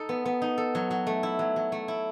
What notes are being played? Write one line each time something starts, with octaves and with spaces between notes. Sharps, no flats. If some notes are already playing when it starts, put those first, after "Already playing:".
Already playing: D#4 A4
B3
B3
D#4
A4
F#3
F#3
A3
E4
F#3
F#3
A3
E4